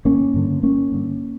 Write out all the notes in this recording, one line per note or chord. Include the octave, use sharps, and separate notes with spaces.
G1 A#3 C#4
G2 D3
G1 A#3 C#4
G2 D3